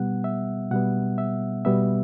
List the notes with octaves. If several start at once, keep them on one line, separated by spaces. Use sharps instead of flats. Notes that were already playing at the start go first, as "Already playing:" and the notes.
Already playing: B2 G3 B3 F#5
E5
B2 G3 B3 F#5
E5
B2 G3 B3 E5